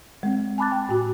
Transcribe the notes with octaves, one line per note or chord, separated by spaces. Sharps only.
G#3 C4
G#5 A5 B5 D6 F#6 A6
G5
A2 F#4